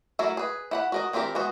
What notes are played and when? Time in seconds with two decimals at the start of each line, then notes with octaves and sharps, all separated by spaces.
0.19 F#3 A3 E4 A4 A#4
0.37 G#4 B4
0.71 E4 F#5 B5
0.92 F#4 A#4 D#5
1.13 E3 C4 D4 G4 A#4
1.35 G#3 B3 F#4